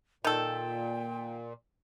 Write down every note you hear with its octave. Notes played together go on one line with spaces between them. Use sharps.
A#2 D#3 A4 G5